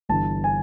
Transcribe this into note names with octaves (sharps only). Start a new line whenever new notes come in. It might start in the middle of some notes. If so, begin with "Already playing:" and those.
G1 G2 E3 A5
G#5